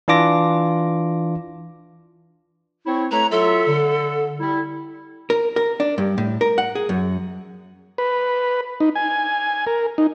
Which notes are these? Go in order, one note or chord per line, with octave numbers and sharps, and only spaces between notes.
E3 D4 F4 D6 A#6
C4 E4 C#5
A3 B4 C#5 A#5
F#3 F4 A4 E5
D3
G3 E4
A#4
A#4
D4
G2
A2
A#4
F#5
G#4
F#2
B4
D#4
G#5
A#4
D#4